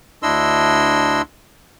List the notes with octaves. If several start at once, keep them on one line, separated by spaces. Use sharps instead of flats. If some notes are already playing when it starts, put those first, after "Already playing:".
D2 D4 E4 D#5 C6 E6